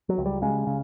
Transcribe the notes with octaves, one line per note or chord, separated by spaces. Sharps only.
F#3
C#2
G3
C#3 G#3
C#3